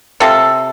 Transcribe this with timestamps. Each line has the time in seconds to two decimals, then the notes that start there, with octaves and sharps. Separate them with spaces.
0.20 C3 F4 A4